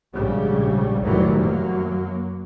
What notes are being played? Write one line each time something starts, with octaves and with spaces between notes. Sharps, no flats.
A#1 G#2 C#3 G3
F1 A2 D#3 E3 F#3 G3
F#2 F#3 A#3